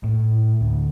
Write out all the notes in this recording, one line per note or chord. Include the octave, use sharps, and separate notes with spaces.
A2
D2